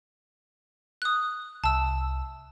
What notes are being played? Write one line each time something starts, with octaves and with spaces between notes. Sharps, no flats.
D#6 F#6
C2 A5 E6